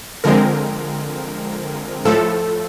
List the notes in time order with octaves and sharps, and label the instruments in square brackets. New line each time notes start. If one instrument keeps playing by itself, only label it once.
[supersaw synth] D3 F3 G#3 C4 A#4
A2 F3 A3 A4